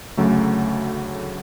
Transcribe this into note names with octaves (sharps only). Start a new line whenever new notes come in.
D2 C#3 F#3 A3